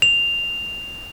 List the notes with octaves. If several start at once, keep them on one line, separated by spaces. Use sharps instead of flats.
F7